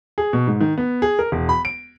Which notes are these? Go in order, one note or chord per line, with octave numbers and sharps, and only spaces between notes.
G#4
B2
G#2
D#3
B3
G#4
A#4
E1
B5
D7